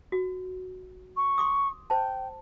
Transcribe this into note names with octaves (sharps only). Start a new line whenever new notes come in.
F#4
C#6
C6 D6 D#6
C5 G5 A5